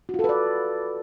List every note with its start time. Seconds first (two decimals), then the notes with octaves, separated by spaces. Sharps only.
0.09 F#4
0.14 F4
0.19 A4
0.24 B4
0.29 D5